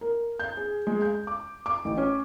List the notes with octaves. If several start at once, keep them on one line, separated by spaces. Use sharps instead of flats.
A#4
G6
G#4
G#3
G6
D6
D6
A1
C#4